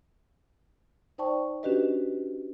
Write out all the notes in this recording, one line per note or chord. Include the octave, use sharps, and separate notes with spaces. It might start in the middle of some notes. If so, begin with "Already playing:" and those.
D#4 C5 D5 G5 A5 C#6
C#4 D4 F#4 G4 B4 D#5